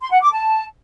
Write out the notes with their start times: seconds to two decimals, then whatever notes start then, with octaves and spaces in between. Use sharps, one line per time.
0.01 C6
0.11 F#5
0.22 D6
0.32 A5